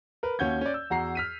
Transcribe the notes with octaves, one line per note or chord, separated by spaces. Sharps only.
A#4 B4
D#2 C#4 F#4 G6 G#6
C#4 D5
E6
E2 F#4 A#5 C7
F6 B6 D#7